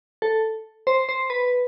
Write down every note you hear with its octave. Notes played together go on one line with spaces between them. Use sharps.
A4
C5
C5
B4